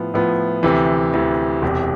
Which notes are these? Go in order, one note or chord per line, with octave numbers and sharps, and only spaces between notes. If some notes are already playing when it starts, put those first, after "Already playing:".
Already playing: A2 F3 B3
A2 F3 B3
D2 C3 E3
D2 C3 E3
E1 E2 C3